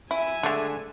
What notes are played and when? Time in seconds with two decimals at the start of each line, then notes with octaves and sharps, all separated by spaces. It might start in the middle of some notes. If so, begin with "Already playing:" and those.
0.11 E4 E5 G#5
0.43 D3 G#3 A3 D4